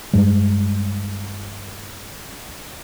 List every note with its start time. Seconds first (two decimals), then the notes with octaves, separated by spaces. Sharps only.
0.13 G2 G3 G#3